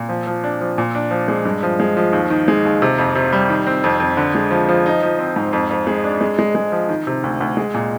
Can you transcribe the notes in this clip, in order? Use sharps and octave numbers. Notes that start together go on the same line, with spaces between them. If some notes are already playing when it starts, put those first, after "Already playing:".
Already playing: A#2
F3
F3
D4
F3
A#2
D4
F3
G#3
G2
F3
G#3
F3
D#2
D#3
G#3
D#2
C3
F2
C3
G3
D#3
C4
F2
F2
D3
G#3
F3
F3
D#4
F3
C4
G#2
F2
F2
G#3
D4
G#3
G#3
G#3
F3
D#3
C3
D2
D2
G#3
A#2